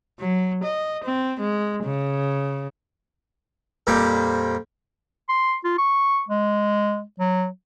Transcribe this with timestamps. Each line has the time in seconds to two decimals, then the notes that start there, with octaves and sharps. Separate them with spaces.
0.20 F#3
0.64 D#5
1.04 C4
1.40 G#3
1.85 C#3
3.87 F2 A#2 G3 D5
5.29 C6
5.64 F4
5.78 C#6
6.28 G#3
7.20 F#3